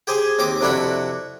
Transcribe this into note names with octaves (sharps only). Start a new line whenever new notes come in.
G4 G#4 C5 G#5
D#2 C4 G4 D6
F2 C3 D4 E4 F#4 B5